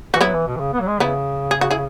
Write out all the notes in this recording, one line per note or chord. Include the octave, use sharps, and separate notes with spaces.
E3 F#4
F#3 B3 E4
E3
B2
E3
C#3
B3
F#3
G#3
C#3 B3 E4
G#4
F#4
E4 G#4